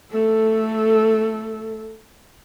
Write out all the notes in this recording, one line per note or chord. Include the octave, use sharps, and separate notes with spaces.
A3 A4